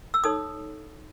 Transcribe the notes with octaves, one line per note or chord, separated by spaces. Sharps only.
E6
D#4 A4 C#5 D#6